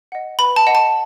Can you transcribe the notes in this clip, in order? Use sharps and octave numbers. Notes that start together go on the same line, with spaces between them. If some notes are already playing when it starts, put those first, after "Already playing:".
D#5 F#5
B4 B5
A5
D#5 F#5
A5